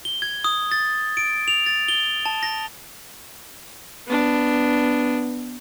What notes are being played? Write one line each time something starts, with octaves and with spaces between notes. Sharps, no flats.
G7
G#6
D#6
A6
D7
F7
A6
G7
A5
A#6
B3 D4